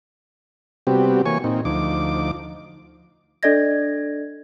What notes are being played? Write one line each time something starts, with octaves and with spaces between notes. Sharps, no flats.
C3 G3 B3 C4 F#4 G4
E3 A#3 C#5 G#5 C#6
A#2 C4 D#4
D2 F3 D#4 D6
D4 A4 D5 D#5 G#6 A#6